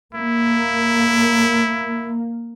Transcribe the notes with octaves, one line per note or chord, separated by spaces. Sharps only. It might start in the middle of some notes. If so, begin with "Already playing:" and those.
A#3 E4